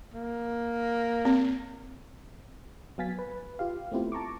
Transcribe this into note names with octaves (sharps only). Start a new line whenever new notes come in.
A#3
C4
F#3 B3 F5 G#5 A6 B6
B4
F4 G4 F5
A3 B3 C4 E4 F4 G4
A5 A#5 C#6 D6